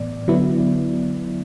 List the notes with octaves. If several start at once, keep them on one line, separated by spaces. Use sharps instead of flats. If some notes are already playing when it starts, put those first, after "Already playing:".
Already playing: A2 E3 B3 D5
D3 F#3 B3 E4